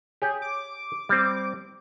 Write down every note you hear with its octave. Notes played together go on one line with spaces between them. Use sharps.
G4 G#4 C#5 G5
D6
G3 C4